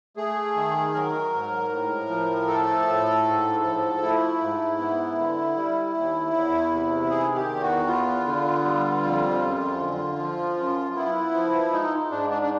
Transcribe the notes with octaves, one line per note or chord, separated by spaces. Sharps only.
A3 G#4
D#3
F#3 A#4
G#2
A2
F3
A3 A4
A2
G#2
F3
A3 E4
G#2
B3
D3
G3
D#2
E2
C3
D#3 G#4
G4
E2
F#4
B3 F4
D3
G3
F2
F#2
D3
F3
F#2
B3 E4
F3
G#3 D#4
G#2 D4
D4
D4